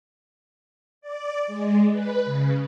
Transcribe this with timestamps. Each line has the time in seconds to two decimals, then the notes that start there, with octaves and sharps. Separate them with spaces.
1.01 D5
1.47 G#3
1.92 B4
2.25 C#3